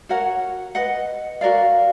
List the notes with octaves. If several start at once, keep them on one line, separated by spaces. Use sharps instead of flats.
F#4 A#4 C#5 F#5
B4 D#5 F#5
F#4 A#4 D5 F5